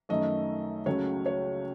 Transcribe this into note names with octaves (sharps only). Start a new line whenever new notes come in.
F#2 D#3 A3 D#5
C#2 C#3 F#3 A3 C#5
C#5